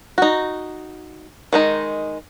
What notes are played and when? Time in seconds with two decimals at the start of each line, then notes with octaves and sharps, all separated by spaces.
0.18 D#4 F#4
1.53 D#3 G#3 D#4